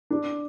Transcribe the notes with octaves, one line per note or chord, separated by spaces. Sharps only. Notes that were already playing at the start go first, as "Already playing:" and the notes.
D4